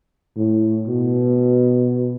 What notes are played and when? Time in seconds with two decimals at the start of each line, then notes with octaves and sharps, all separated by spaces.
0.36 A2
0.87 B2